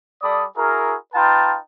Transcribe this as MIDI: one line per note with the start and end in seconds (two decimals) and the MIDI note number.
0.22 0.44 55
0.22 0.44 69
0.22 0.44 74
0.22 0.44 83
0.22 0.44 87
0.57 0.95 64
0.57 0.95 66
0.57 0.95 68
0.57 0.95 70
1.14 1.57 63
1.14 1.57 65
1.14 1.57 71
1.14 1.57 77
1.14 1.57 79
1.14 1.57 81